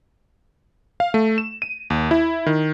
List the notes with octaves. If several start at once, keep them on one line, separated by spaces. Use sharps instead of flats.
F5
A3
E7
D#7
D#2
E4
D#3